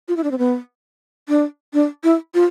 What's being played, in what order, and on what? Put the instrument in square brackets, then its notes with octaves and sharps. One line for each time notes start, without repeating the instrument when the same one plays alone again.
[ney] F4
E4
D4
C4
B3
D4
D4
E4
F4